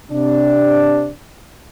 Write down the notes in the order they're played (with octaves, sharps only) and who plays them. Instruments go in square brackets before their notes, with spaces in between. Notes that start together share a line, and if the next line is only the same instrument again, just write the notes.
[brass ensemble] C3 D4